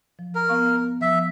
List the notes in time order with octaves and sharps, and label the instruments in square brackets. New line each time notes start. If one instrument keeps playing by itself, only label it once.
[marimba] F3
[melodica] A#4
[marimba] B3 F5 C#6
[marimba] F3 [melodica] E5